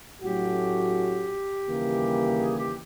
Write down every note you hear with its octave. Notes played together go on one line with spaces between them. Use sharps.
A2 F#3 A3 C#4 F#4 G4
D#2 C#3 E3 G3 A#3
G#4
G4